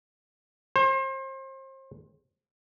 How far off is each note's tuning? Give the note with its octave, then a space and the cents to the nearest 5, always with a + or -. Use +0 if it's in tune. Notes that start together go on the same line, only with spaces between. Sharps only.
C5 +35